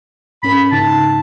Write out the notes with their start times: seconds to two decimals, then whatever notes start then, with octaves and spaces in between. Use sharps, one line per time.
0.43 G#2 C#4 A#4 B5
0.71 G#2 C#3 D#4 A5